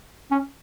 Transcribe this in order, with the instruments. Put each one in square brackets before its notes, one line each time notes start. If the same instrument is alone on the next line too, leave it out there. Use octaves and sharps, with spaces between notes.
[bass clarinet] C#4